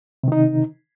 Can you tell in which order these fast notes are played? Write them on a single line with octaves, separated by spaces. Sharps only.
C3 D#3 D#4